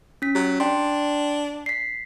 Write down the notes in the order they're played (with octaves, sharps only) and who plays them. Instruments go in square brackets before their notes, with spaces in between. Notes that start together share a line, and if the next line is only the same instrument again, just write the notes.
[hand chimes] C#4 B6
[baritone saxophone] F#3 [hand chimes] G4
[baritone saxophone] D4 [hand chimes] G5 C6
[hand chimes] B6 C7